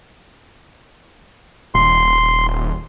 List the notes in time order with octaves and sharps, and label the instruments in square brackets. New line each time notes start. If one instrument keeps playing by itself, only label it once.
[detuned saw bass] D#1 [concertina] C6